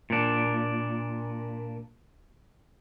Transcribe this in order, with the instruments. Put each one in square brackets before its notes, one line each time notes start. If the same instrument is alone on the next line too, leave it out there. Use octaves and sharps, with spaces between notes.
[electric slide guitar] A#2 D4